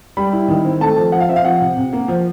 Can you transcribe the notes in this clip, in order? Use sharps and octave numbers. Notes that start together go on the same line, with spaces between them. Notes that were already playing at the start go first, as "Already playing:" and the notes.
G3 B5
E4
D#3
C4
A3 A5
F3
F3 F#5
F5
C4 E5
F5
F3 F#5
C3
C3
A#3
F3